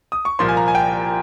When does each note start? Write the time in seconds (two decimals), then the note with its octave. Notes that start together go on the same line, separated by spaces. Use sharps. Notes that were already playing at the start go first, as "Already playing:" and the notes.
0.12 D#6
0.25 C#6
0.39 C2 A#2 F3 A#3 C6
0.48 G#5
0.57 A#5
0.68 G#5
0.75 G5